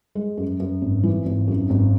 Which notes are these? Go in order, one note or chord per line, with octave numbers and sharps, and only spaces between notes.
G#3
F#2
F#2
G#1
E3
G#1
F#2
G#1